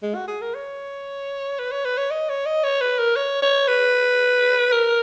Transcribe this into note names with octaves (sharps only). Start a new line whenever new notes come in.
G#3
F#4
G#4
A#4
C#5
B4
C#5
B4
C#5
D#5
C#5
D#5
C#5
B4
A#4
C#5
C#5
B4
A#4